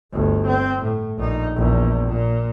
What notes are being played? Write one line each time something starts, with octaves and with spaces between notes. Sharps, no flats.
G1 D2
C4
A2
A#1 D#4
A#1 E2
A#2